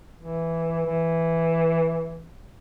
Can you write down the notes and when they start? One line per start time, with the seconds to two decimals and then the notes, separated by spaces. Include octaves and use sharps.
0.20 E3
0.85 E3